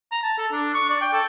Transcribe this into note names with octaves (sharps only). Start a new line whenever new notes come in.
A#5
A5
A4
D4
C#6
D5
G5
A4